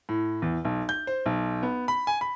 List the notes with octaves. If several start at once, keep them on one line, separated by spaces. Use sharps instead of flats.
A2
E2
B1
G6
C5
B1
B3
B5
G#5
B5